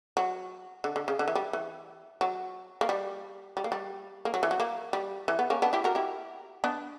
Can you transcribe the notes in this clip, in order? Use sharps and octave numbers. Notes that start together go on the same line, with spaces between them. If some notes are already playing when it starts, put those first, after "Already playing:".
F#3
D3
D3
C#3
D3
E3
G3
E3
F#3
A#3
G3
G3
A#3
G3
A#3
F#3
E3
F#3
A#3
G3
E3
B3
A#3 C#4
B3 D4
E4 G4
F#4 A#4
E4 G4
B3 D4